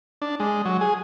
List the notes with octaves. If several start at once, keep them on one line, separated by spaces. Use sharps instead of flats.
D4
G#3
F#3
G#4